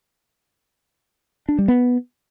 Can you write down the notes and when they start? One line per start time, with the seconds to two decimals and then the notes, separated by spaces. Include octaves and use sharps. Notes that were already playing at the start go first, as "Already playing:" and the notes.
1.49 D4
1.58 G3
1.68 B3